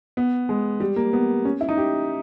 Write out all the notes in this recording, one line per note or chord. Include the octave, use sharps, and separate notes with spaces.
B3
G#3
G3
A#3
B3
C#4
E4
D#4
G4